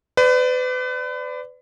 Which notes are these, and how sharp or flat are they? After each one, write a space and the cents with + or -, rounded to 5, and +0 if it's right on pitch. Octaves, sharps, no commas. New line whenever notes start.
B4 +35 D5 +0